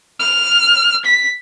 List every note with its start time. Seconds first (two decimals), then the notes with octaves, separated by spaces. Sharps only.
0.20 F6
1.05 B6